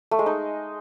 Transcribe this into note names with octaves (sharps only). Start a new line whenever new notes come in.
A3
G#3
D#4